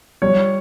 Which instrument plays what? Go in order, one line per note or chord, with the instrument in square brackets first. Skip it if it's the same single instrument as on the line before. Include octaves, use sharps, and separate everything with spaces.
[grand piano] G3 C#5